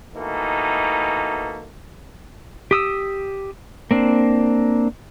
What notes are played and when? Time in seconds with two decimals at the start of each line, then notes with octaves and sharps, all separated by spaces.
0.15 B2 E3 A3 A#3 D#4
2.71 G4 D#6 E6
3.91 A#3 C4 D4